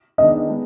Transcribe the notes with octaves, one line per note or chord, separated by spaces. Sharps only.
D#3 G#3 B3 D4 D#5
G#3 B3 D4